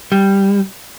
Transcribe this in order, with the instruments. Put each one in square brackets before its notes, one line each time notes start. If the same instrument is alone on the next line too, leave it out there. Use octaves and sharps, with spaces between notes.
[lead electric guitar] G3